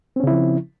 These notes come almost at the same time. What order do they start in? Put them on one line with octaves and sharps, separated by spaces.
C4 C#4 C#3 E4 F3